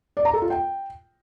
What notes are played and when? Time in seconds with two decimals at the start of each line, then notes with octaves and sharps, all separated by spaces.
0.17 D5
0.25 A#5
0.33 A4
0.42 F4
0.50 G5